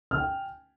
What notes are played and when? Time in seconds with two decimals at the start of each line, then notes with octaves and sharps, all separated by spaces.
0.11 F6
0.14 G#5
0.18 G5